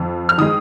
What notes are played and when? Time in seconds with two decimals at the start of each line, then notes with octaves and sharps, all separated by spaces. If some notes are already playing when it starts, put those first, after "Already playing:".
Already playing: F2
0.29 F6
0.38 D#3 G#3 D#6